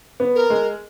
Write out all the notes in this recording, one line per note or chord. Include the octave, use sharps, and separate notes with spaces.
B3
A#4
G#3